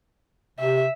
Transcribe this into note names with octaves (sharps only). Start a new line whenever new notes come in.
C3 E5